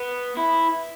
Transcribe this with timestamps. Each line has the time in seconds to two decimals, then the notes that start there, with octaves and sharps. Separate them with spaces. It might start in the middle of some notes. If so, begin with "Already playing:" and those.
Already playing: B3
0.37 E4